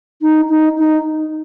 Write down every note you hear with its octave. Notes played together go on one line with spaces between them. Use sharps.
D#4
D#4
D#4